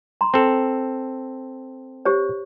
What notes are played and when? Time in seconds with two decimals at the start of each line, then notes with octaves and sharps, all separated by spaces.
0.21 A#5 C6
0.34 C4 A4
2.05 G4 C5 C#5